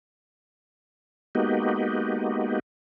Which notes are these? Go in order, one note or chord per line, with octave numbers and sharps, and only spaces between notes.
G#3 A#3 B3 D#4 F#4 G4